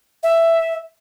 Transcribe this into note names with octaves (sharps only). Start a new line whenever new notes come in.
E5